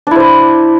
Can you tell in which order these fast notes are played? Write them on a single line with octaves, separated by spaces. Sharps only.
D4 E4 C5 D5